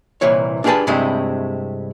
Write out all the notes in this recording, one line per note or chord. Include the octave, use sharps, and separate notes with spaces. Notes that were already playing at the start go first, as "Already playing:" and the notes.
C2 A#2 E3 C#5
D4 F4 G4 G#4 B4 A5
G2 C3 G#3 A3 C4 E4